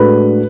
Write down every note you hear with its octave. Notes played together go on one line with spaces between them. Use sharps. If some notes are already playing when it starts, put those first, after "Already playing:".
Already playing: A2 G#3 D4 F#4 A4 B4